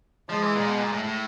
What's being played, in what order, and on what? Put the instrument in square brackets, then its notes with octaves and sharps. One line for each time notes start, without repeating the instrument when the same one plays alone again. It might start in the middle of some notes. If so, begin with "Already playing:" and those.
[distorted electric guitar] F3 [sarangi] G#3
[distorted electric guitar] E3
A#2
B2
A#2
A2
A2